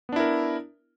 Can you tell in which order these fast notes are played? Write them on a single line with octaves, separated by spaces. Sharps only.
B3 D4 E4 A#4